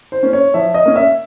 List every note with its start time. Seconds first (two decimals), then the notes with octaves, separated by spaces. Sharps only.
0.12 C5
0.23 A#3 C#4
0.33 C#5
0.54 F3 E5
0.74 D#5
0.85 A#3 C#4
0.96 E5